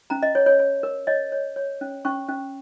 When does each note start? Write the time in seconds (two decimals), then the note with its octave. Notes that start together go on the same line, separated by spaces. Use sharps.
0.10 C#4 A#5
0.23 D#5
0.35 C#5
0.46 C#5
0.59 C#5
0.83 A#4
1.07 C#5 D#5
1.32 C#5
1.56 C#5
1.81 C#4
2.05 C#4 C#6
2.29 C#4